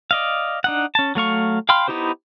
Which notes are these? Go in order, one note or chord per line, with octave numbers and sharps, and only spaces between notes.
D5 D#5 F5
D4 D#4 F#5
C#4 A5
F#3 A3 F5 C#6
F5 G5 B5 C6 F6
B3 D#4 E4 G4 C5